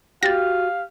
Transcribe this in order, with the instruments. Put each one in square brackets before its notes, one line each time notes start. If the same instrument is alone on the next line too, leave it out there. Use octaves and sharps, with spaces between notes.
[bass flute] F#4 [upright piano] G4 [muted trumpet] F5 [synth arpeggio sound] A6 A#6